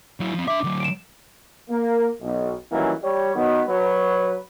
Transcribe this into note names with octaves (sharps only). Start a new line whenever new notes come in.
F#3 E4
F3 C4
D4 E5 D6
D3 F#3
D7 E7
A#3
B1
D#3 E3 F#3 G3 A#3 C#4
G3 C#5
D#3 F#3 B3
F#3 B4